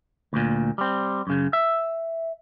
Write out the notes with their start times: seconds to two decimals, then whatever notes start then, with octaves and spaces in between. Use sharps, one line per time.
0.33 D2 A#2
0.78 G3 C4
1.27 F#2 C#3
1.53 E5